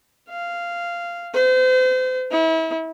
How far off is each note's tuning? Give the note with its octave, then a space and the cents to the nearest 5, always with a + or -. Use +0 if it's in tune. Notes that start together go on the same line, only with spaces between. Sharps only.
F5 -10
C5 -35
E4 -35